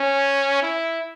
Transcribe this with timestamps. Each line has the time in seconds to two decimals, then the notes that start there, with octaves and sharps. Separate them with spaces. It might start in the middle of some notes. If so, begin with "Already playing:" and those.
Already playing: C#4
0.63 E4